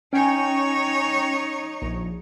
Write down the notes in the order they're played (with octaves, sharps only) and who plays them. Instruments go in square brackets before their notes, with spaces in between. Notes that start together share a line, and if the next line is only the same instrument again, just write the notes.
[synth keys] C#4 G5 G#5 [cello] D#4 C#5
[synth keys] A#1